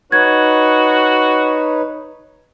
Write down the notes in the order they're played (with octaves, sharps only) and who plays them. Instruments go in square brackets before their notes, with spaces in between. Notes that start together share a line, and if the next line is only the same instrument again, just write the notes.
[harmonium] D#4 B4 C#5 [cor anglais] F#4 [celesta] G#6